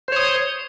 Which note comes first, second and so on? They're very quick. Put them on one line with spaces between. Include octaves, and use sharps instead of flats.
C5 C#5 D#6